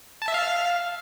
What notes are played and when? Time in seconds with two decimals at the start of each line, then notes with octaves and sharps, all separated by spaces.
0.22 A5
0.28 E5
0.34 F5